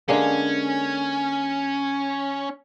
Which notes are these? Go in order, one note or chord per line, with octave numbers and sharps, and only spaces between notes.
D3 G#3 A#3 C#4